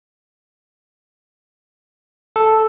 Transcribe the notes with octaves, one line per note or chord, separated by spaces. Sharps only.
A4